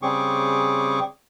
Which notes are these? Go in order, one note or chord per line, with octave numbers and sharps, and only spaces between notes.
C#3 G3 C4 G#4 C#6 D6